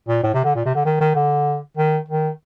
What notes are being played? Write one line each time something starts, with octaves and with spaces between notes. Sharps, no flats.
A#2
A2
C3
D3
A#2
C3
D3
D#3
D#3
D3
D#3
D#3